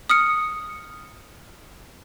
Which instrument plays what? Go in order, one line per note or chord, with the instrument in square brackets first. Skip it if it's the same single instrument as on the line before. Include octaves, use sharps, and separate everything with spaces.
[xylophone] D#6 F6 C#7